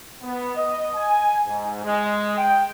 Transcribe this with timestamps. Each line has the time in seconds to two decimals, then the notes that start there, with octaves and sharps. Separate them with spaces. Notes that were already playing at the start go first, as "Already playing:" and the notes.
0.22 B3
0.55 D#5
0.95 G#5
1.46 G#2
1.84 G#3
2.37 G5